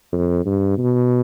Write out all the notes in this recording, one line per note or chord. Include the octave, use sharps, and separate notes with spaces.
F2
G2
B2